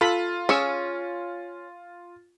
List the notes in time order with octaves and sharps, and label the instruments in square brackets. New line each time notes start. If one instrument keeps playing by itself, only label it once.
[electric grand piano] F4 [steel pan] A4 B5
[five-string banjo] C#4 [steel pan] G#4 C#6 E6